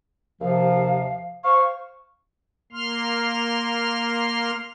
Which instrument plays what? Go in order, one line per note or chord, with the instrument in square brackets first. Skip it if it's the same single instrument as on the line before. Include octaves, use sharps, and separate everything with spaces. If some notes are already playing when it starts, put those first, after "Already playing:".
[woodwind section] D#2 C3 F3 [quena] F5
[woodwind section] C5 F5 [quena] C#6
[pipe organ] A#3 C6 F6